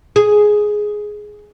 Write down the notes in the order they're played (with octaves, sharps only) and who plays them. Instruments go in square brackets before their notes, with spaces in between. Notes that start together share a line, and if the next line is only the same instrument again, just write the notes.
[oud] G#4